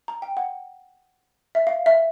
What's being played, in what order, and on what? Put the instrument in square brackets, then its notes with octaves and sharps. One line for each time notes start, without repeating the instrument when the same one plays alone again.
[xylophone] A#5
G5
F#5
E5
F5
E5